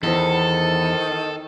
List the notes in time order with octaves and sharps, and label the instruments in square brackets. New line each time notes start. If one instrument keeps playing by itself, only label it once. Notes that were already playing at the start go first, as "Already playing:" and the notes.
[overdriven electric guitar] E2 [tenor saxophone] D#3 [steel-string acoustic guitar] E4 C5 [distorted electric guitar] A4